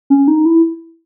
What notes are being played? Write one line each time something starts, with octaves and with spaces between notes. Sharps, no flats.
C#4
D#4
E4